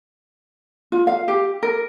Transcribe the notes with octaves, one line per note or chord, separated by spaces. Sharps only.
F4
F5
G4
A#4